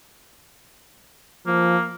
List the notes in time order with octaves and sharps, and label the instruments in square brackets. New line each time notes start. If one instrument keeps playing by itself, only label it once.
[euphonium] F3 [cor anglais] A#3